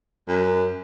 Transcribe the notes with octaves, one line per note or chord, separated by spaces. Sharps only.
F#2